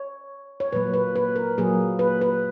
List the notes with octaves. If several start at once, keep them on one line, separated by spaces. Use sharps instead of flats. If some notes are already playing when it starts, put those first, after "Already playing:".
Already playing: C#5
C#5
A#2 F#3 A#3 B4
B4
B4
A#4
A#2 F#3 A#3 G#4
B4
B4